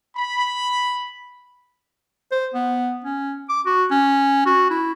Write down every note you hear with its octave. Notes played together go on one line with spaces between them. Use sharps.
B5
C5
B3
C#4
D6
F#4
C#4
F#4
E4